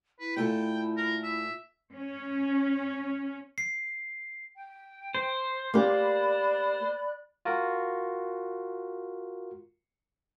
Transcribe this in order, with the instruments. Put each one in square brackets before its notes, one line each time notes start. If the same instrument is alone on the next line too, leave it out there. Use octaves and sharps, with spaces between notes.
[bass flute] E4 [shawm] B4
[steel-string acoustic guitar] A#2 A3 A4 [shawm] G5
[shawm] A#4
E5
[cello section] C#4 C#5
[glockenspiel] C7
[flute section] G5
[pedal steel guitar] C5
[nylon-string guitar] A#3 G4 [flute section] D5 B5 F#6
[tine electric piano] F4 F#4 A#4